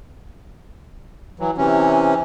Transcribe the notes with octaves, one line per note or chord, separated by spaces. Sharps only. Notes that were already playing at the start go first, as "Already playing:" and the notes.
E3 F#3
C3 E3 C#4